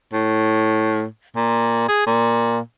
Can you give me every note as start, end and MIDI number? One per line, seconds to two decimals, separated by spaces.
0.13 1.05 45
1.36 1.87 46
1.88 2.02 68
2.06 2.59 46